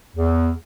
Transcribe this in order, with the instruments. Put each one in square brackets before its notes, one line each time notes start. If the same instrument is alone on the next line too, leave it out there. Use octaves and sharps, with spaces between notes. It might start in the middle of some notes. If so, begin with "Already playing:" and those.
[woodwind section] E2